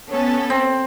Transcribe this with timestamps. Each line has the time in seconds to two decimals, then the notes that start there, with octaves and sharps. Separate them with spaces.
0.11 B3 C#4 A4
0.50 C4